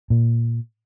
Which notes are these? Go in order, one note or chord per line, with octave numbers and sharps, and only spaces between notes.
A#2